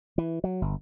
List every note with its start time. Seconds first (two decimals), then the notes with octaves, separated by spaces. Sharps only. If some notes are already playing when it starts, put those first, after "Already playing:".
0.18 E3
0.44 F#3
0.62 G1